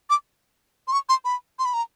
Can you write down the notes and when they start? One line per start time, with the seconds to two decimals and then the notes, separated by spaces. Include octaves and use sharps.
0.10 D6
0.88 C6
0.93 C#6
1.09 C6
1.25 B5
1.59 C6
1.65 B5
1.74 A#5